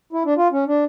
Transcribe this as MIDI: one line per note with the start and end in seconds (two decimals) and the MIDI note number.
0.13 0.23 64
0.25 0.34 62
0.37 0.48 65
0.52 0.64 61
0.67 0.84 62